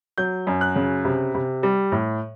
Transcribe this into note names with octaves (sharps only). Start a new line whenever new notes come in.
F#3 G6
F#2
F#6
C#3
C3
C3
G3
A2